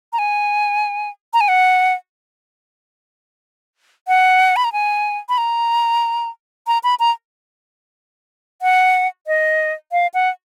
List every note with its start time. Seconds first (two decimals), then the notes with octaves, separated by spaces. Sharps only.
0.13 A#5
0.19 G#5
1.33 A#5
1.41 G#5
1.48 F#5
4.08 F#5
4.56 B5
4.64 A#5
4.73 G#5
5.29 B5
5.38 A#5
6.67 A#5
6.84 B5
7.00 A#5
8.62 F#5
9.27 D#5
9.92 F5
10.14 F#5